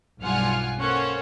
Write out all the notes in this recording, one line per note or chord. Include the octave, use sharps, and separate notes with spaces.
B1 G2 F4 F#5 G#5 F6
A#3 C#4 A4 C5 C#5 F#5